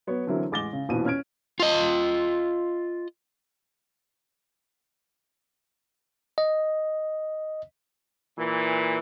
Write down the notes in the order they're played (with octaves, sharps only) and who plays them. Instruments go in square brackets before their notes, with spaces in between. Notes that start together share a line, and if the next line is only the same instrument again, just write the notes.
[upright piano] F#3 B3 C#5
D3 E3 F#3 C4 E4 A#4
A1 G#3 D6 A6 A#6 G7
C#3
A#1 F2 B2 E3 B4 D#7
C#4 F6 G#6 D7
[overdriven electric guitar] F4 D#5
[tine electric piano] D#5
[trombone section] A#2 E3